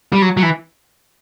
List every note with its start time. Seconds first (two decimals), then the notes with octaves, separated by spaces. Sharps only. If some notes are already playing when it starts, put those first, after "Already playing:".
0.12 G3
0.22 F#3
0.37 F#3
0.43 E3